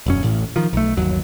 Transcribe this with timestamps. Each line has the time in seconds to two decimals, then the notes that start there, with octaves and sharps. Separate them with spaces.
0.06 E1 F#2 C#4
0.23 A1 A2
0.56 D#3 F3
0.73 B1 A3
0.97 G1 D#2 F#3